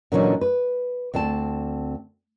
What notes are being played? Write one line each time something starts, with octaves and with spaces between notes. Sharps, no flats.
A#2 D3 E3 F#3 C#4 D#4
B4
D2 C4 D5 A5